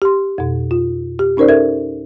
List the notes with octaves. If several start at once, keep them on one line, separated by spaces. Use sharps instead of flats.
G4 C6
F2 B2
F4
G4
C#4 D#4 A#4 C5 D5
A4 A#4 E5 G#6